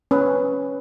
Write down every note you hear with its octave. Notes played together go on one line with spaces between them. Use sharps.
C#4 B4